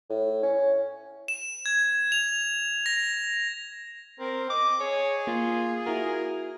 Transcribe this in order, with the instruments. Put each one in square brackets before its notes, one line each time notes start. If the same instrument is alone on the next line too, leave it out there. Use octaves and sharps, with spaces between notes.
[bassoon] A2
C#4
[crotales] E7
G#6
F7
A#6
[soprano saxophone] C4 [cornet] A#4
[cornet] D#5 [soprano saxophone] D6
[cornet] G#4 [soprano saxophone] C#5
[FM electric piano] A#3 [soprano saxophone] F4
[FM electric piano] E4 F#4 [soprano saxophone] A#4